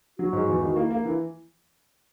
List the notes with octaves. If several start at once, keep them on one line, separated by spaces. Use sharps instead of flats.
F#3 F#4
G#2
E2
D#3
F#4
A#3 E4
A#3
E3